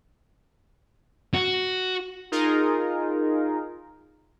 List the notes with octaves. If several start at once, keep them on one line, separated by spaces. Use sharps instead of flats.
F#4
D#4 F4 G#4 A#4